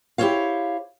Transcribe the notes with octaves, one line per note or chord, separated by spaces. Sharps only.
E4 G4 A4 C5 C#5 F5